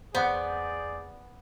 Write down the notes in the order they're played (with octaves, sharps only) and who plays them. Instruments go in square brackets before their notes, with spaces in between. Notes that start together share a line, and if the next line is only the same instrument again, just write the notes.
[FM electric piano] E2 G6 [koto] B3 [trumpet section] G#4 D5 [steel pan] C5 F#5